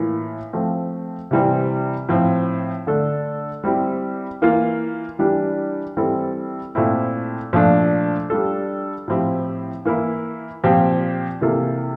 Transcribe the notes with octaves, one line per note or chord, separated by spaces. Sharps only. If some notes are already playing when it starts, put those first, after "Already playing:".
Already playing: A2 E3 A#3 F4
F3 A3 C4
C3 E3 G3 C4
A2 F3 C4
D3 A3 D4 A4
G3 C4 E4 G4
E3 A#3 F4
E3 G3 D4 G4
E3 G3 C4 E4 A4
A#2 A3 C4 E4
A#2 F3 A3 D4
G3 D4 F4 A4
A2 F3 C4 E4 G4
E3 A#3 E4
A#2 F3 C4 G4
C3 E3 A#3 F4 A4